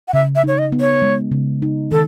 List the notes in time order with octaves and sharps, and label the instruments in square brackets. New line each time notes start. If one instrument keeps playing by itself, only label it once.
[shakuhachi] F#5
[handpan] C#3 [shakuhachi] E5
[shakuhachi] E5
[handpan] D#4 [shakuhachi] C#5
[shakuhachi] D#5
[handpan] B3
[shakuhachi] C#5
[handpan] G#3
C#3
D#4
[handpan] D#3 [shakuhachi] A4